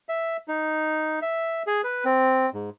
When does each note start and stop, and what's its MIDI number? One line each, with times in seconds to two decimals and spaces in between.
0.09 0.37 76
0.48 1.20 63
1.22 1.63 76
1.67 1.82 68
1.84 2.05 71
2.05 2.50 60
2.54 2.70 44